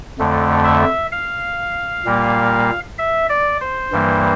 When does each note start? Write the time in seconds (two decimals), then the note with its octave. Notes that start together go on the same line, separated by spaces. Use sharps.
0.19 F2 D3 A3
0.65 E5
1.12 F5
2.05 A#2 G3 A#3
2.99 E5
3.29 D5
3.61 C5
3.92 G2 E3 G3 A#3